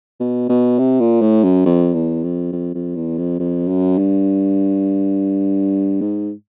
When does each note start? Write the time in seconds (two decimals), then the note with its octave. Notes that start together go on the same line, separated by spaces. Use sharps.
0.20 B2
0.49 B2
0.79 C3
1.00 A#2
1.22 A2
1.44 F#2
1.66 F2
1.94 E2
2.23 F2
2.52 F2
2.75 F2
2.96 E2
3.18 F2
3.40 F2
3.68 F#2
3.98 G2
6.01 G#2